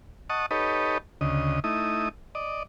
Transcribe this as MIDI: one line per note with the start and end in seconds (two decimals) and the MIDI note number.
0.30 0.46 75
0.30 0.46 78
0.30 0.46 81
0.30 0.46 85
0.30 0.46 87
0.51 0.98 63
0.51 0.98 67
0.51 0.98 69
0.51 0.98 71
0.51 0.98 73
0.51 0.98 75
1.21 1.60 38
1.21 1.60 49
1.21 1.60 75
1.64 2.09 57
1.64 2.09 63
1.64 2.09 64
1.64 2.09 87
2.35 2.63 74
2.35 2.63 75